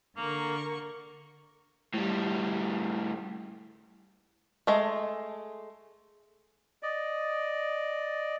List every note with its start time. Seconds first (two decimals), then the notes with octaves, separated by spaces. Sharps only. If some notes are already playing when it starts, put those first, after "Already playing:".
0.17 D3 A#3 A#4 C#6
1.94 A2 G3
4.67 G#3 A3
6.83 D5 D#5